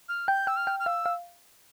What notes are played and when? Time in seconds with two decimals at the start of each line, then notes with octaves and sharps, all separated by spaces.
0.09 F6
0.28 G5 G6
0.47 G5 E6
0.57 F6
0.67 G5
0.80 F6
0.86 F5 E6
1.06 F5